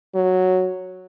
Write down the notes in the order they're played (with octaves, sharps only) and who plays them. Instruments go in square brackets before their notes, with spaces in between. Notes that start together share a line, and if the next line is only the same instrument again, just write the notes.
[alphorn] F#3